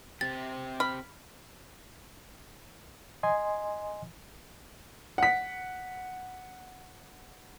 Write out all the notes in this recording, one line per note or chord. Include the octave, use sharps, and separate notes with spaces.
C4 G4 A6
B5 F6
D#5 G#5 C6
F#5 B6